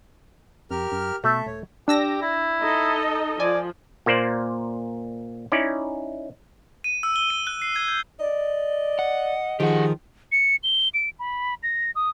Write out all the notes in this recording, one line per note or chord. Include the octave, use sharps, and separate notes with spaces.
F2 G4 A#4 F6
F#2
B2 A3 A4 E5
D#1 C#5
D4 G4 E6 A#6
E4
D#4 A4 D#5
F3 D5 G#5
A#2 A#3 C5 D5
C#4 D#4 E4 D5
D#7
E6
G7
D#7
F#6
C7
G#6
G6
D5 D#5
F#5
D#3 F3 G4 G#4 F#5
C#7
G7
D7
B5
A#6
D#6